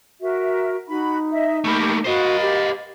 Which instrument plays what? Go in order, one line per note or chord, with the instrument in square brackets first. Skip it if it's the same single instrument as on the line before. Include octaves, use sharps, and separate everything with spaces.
[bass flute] F#4 [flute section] A#4 E5
[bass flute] D#4 [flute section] F#4 B5
[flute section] D#5 E5
[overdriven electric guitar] A3 A#3 [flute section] G4 B5 D6
[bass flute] F#4 [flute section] A#4 F5 B5 [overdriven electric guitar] C5 D#5
[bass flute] G4